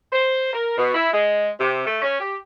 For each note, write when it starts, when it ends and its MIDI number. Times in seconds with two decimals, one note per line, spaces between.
0.12 0.50 72
0.53 0.76 70
0.78 0.93 47
0.95 1.12 64
1.13 1.50 56
1.60 1.86 48
1.87 1.99 57
2.02 2.19 61
2.20 2.37 67